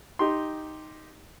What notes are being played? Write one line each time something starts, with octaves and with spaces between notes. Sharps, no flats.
D#4 G4 C6